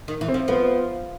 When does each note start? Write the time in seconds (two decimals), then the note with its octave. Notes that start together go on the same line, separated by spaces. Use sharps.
0.08 D#3
0.21 E3
0.28 C4
0.34 F3
0.48 F3 B3